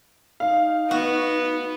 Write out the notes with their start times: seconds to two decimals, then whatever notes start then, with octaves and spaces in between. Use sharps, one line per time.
0.40 D#4 F5
0.91 B3 F#4